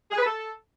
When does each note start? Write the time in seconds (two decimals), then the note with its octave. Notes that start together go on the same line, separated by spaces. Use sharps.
0.11 G#4
0.18 B4
0.24 A4